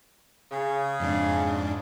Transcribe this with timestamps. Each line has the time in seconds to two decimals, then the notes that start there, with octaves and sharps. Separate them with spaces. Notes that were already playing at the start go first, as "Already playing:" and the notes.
0.52 C#3
1.00 F2 G#2 D4